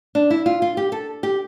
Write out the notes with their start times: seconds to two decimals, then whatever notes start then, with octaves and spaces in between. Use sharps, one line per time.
0.15 D4
0.30 E4
0.46 F4
0.62 F4
0.77 G4
0.92 A4
1.23 G4